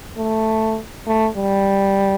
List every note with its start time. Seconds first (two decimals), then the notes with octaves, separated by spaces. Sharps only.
0.18 A3
1.07 A3
1.37 G3